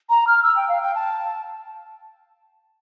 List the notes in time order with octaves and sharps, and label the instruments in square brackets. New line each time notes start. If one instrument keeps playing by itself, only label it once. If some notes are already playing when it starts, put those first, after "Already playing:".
[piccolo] A#5
F6
E6
G5
F5
G5
A5